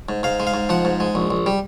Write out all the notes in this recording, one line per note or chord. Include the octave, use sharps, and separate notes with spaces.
G#2
G#2 F5
G#3
F5
G#2
F3 F#5
G#2
G#3
A#1
A#1
G3